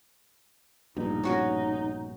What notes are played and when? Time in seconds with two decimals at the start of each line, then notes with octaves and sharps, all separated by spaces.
0.97 A#1 G2 B2 D#4
1.23 C#4 F#4 A#4